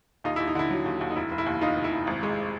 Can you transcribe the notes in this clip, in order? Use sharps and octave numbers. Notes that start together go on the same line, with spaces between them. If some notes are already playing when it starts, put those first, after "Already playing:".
D#2 D#4 F4
E4
D#2
D#4
D3 E4
F#3
D#2
D#2
D#4
F1 E4
F1
E4
D#2
D#3 D#4 F4
F1
E4
F1
G#1
G#3